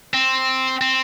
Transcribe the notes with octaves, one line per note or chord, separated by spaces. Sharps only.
C4
C4